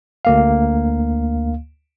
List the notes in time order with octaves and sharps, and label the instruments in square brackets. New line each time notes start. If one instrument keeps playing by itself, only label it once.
[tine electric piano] D2 A#3 F5